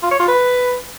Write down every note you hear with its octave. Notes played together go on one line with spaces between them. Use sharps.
F4
C#5
F4
B4